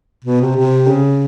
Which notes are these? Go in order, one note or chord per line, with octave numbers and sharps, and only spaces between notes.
B2
C3
C3
C#3